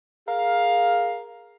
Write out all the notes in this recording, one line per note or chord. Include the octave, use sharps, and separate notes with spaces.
G#4 A#4 F5